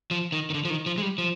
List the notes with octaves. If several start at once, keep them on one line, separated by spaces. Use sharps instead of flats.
F3
D#3
D#3
D3
F3
D#3
F3
G#3
G3
F3